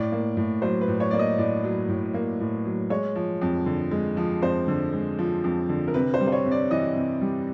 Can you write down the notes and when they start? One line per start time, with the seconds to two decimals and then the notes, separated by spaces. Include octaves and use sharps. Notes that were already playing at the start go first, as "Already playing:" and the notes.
Already playing: A2 D5
0.12 A#3
0.37 A2
0.62 F#3 C5
0.81 B4
0.88 A2
1.00 C#5
1.11 A#3 D5
1.19 D#5
1.38 A2 D5
1.64 F#3
1.88 A2
2.14 A#3
2.40 A2
2.65 F#3
2.90 G#3 C#5
3.16 F3
3.42 F2
3.66 D3
3.91 G#3
4.17 F3
4.42 F2 C5
4.68 D3
4.93 G#3
5.19 F3
5.44 F2
5.69 D3
5.88 A#4
5.94 C3 B4
6.14 C5
6.20 G3
6.27 C5
6.32 C#5
6.45 C3
6.51 D5
6.71 E3 D#5
6.95 C3
7.21 G3